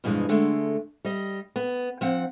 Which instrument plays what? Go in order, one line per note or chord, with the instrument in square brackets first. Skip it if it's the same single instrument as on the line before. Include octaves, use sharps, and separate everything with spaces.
[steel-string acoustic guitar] G2 B2 E3 F3 G#3
D3 G#3 A3
G3 D#5
B3
F3 C4 F#5